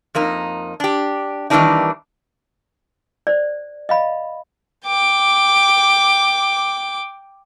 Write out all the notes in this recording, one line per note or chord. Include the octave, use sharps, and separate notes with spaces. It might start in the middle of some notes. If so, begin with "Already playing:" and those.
F2 A#3 D#4
D4 G4
D#3 E3 G3 A#3 D4 D#4
C5 D5
D#5 F5 B5
G5 D6